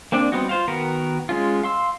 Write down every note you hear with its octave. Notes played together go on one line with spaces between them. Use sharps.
A#3 C4 D4 D5
G3 B3 C4 D#4 F#4
F4 C5 F5
D#3 B3 F#4 A#4 B4
G#3 C#4 F4
F5 C6 E6